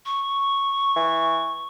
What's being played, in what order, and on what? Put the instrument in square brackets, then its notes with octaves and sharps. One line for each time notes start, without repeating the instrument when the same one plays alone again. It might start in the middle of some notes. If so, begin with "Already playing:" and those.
[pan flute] C#6
[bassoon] E3